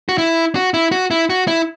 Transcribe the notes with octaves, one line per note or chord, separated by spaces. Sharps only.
F#4
E4
F#4
E4
F#4
E4
F#4
E4